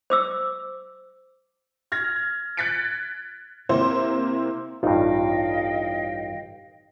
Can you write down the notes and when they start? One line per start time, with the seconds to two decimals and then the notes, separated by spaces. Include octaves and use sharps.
0.10 C5 D6 E6
1.92 F6 G#6 A#6
2.57 F#6 G#6 A6 B6 C#7 D7
3.69 C3 A#3 C4 E4 C5
4.83 A1 G2 D#4 F4 D#5 F5 G5